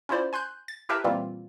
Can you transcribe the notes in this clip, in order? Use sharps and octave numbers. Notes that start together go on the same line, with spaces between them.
C#4 E4 F4 C5 D5
G#5 C6 F#6 G6
A6
E4 G4 A#4 B4 E5 A5
A#2 E3 G3 A#3 C4 F4